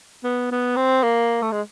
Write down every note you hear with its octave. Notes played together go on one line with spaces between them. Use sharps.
B3
B3
C4
A#3
A3
G#3